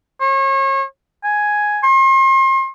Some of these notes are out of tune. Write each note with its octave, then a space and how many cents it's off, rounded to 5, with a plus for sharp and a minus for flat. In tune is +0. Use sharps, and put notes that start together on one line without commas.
C#5 -35
G#5 +5
C6 +40